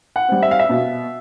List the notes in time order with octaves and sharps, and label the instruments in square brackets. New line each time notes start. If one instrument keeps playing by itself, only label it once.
[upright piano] F#5
G3 C4
E5
F5
E5
B2